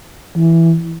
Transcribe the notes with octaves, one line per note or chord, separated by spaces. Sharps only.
E3